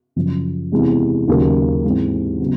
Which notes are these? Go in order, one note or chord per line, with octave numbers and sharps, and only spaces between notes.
F#2 C#3 F3
E2 C3 E3 G#3
D#2 C#3 F#3 A#3
G#2 E3 G#3 C4
C#3 F#3 B3